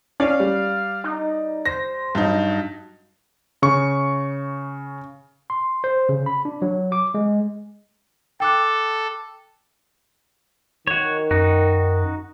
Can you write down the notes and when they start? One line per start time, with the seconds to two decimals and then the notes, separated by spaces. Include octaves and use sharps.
0.20 C#4 D5 F5
0.40 G3
1.04 D#4
1.65 C5 A#6
2.15 G2 F#3 D#4
3.62 C#3 C#6
5.50 C6
5.84 C5
6.09 C#3
6.26 B5
6.45 D4
6.62 F#3
6.92 D6
7.14 G#3
8.40 A4 G5 D6 F#6
10.87 D#3 F#4 C#5
11.31 F#2 D#4 F#4